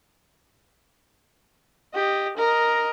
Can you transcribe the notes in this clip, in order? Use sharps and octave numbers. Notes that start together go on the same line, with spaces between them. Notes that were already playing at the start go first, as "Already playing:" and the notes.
G4 D#5
A#4 D#5